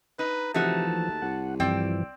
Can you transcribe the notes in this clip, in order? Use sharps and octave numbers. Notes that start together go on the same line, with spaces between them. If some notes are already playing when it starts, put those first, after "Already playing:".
D#4 B4
C3 E3 F3 A3 D#4 F#4 A5
D#2
C2 F#5
G2 E3 F3 C4 D5 G5